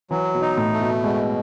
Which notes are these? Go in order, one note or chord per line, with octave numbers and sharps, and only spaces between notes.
E3 F#3
B2
D#4
A2
A3
B2
B2 G#3